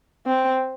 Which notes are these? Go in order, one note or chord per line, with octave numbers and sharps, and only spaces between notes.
C4